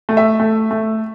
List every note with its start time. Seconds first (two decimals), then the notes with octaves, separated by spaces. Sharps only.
0.09 A3
0.17 E5
0.40 A3
0.71 A3